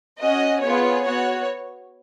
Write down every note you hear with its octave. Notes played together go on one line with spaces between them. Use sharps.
C#4 F#4 D#5
B3 F4 G#4 C#5
B3 F#4 C#5